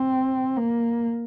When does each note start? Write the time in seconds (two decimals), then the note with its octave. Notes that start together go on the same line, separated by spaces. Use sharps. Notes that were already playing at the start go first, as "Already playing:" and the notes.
Already playing: C4
0.57 A#3